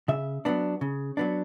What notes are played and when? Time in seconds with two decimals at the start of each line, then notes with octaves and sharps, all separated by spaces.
0.08 C#3 E5
0.45 F#3 B3 D4
0.81 C#3
1.17 F#3 B3 D4